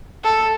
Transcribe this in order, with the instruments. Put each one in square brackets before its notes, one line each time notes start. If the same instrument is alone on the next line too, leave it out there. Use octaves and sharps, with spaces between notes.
[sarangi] A4